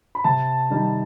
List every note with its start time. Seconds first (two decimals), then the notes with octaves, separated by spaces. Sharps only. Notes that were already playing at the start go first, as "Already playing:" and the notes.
0.15 B5
0.24 C3 A5
0.70 D#3 G3 D#4